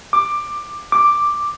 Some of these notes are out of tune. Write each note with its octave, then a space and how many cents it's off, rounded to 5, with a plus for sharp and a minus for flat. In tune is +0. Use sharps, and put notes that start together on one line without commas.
D6 +15
D6 +5